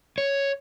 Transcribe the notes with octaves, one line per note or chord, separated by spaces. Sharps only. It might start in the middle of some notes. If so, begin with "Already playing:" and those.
C#5